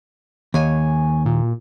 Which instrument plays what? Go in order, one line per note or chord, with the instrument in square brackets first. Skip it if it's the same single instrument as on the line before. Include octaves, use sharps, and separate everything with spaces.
[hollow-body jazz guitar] D#2 [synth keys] C#5 G#5
[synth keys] A#2